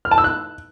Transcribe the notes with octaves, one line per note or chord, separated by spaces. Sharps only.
F6
A5
E6
F#6